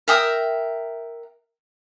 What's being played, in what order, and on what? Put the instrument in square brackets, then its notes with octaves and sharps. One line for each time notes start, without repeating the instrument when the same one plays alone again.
[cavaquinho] A#4 E5 G5 D#6